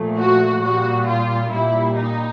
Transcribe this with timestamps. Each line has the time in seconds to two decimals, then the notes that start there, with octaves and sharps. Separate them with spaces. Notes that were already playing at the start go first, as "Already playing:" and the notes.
Already playing: A#2 F3 A3
0.18 F#4
0.63 A#2 G3 F#4
1.07 F4
1.52 A#2 G3 E4
1.96 D#4